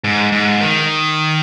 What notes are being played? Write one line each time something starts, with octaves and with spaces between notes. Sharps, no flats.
G#2
G#2
D#3